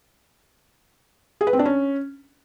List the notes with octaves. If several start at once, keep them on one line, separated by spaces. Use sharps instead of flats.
G#4
B4
C4
D4
C#4